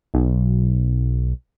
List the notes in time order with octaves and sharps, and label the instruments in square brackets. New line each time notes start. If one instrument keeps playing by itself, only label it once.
[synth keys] B1